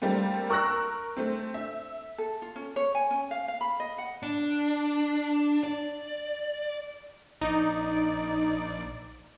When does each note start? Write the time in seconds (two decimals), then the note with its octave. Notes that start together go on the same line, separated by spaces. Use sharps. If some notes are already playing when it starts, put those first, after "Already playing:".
0.02 G3 A3 A#3 C4
0.49 A#4 C#6 E6 F#6 A#6
1.17 A3 C4
1.54 E5
2.18 A4
2.42 F4
2.56 C#4
2.76 C#5
2.95 G#5
3.10 C#4
3.31 F5
3.48 F5
3.61 B5
3.80 D#5
3.98 F#5
4.23 D4
5.63 D5
7.41 A#1 D#4 D5